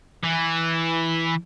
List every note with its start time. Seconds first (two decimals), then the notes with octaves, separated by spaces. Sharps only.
0.24 E3